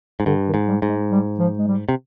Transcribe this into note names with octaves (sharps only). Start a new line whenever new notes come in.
G#2
G2 D3
D#3
G#2
G3
G#2
G#3
G3
F3
G#3
G3
C3